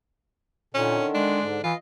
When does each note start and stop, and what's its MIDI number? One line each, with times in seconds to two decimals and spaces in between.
0.75 0.99 46
0.75 1.40 50
0.75 1.40 51
0.75 1.08 61
1.15 1.45 56
1.15 1.61 62
1.41 1.61 44
1.41 1.61 50
1.64 1.73 52
1.64 1.75 65
1.64 1.78 75